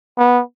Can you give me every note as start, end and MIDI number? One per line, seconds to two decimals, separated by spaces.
0.18 0.41 59